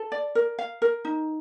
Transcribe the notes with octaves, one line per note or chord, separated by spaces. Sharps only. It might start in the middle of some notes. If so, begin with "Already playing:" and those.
Already playing: A4
D5
A#4
F5
A#4
D#4